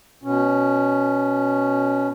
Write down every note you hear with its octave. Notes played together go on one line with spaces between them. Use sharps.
B2 C#4